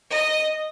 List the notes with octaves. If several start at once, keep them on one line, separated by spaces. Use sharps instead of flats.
D#5